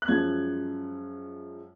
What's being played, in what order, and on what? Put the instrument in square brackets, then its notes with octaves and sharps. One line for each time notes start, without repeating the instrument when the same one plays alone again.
[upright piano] F#6
F#2 F3 G#3 G#6